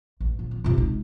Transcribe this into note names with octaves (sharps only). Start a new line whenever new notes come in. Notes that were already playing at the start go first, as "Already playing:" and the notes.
A1
A#1
F2
C3 F4
G#3 D#4